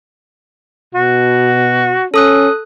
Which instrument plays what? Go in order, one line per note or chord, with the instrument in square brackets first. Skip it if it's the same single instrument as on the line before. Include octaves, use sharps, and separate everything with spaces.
[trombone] B2 [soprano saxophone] F#4
[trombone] C#4 [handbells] A4 D#6 F#6